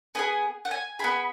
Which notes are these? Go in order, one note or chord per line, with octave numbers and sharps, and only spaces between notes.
B3 E4 G#4 G#5
F#5
G#5
B3 E4 G#4 B5